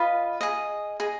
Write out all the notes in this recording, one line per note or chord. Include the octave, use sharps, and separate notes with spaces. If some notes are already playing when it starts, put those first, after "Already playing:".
Already playing: F4 B4 D#5 F5
G#4 D#5
G#4 D#5